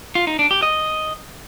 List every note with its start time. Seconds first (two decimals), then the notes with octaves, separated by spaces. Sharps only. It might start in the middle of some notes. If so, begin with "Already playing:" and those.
0.15 F4
0.27 D#4
0.39 D4
0.51 G4
0.62 D#5